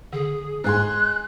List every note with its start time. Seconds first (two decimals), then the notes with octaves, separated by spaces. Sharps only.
0.13 D3 G#4
0.64 G#2 G#3 G#4 C6 F#6